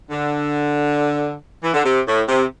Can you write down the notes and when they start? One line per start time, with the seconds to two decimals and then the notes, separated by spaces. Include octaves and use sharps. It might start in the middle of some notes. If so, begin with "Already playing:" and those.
0.11 D3
1.63 E3
1.74 D3
1.85 C3
2.07 A2
2.29 C3